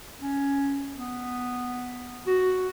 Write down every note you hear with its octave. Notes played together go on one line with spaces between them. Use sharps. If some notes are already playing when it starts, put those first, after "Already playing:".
C#4
B3
F#4